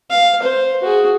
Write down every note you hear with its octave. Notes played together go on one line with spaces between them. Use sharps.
F5
C5
F#4 G#4